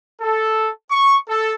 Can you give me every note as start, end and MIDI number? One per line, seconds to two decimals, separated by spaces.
0.21 0.69 69
0.89 1.15 85
1.27 1.53 69